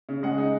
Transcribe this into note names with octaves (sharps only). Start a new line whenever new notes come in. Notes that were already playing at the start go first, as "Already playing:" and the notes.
C#3
G#3 F#5
D#4